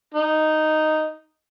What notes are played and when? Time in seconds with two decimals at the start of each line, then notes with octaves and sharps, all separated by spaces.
0.14 D#4